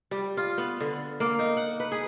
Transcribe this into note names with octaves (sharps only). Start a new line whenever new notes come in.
G3
F4
B3
D3
A#3
D#4
F#5
B4
G#4